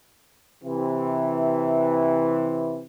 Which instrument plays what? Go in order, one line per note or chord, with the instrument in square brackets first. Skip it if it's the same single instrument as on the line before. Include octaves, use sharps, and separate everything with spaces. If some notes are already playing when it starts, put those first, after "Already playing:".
[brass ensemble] C3 E3